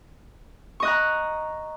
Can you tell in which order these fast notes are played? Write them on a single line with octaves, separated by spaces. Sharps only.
C#6 D#5 F#6 A#5